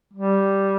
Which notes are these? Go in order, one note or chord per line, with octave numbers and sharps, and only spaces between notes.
G3